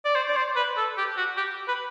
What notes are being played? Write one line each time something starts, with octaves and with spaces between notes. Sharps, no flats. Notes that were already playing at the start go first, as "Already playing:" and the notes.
D5
C5
D5
C5
B4
A4
G4
F#4
G4
B4